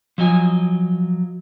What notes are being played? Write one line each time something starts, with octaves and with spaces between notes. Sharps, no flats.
F3 F#3 D#5 G#5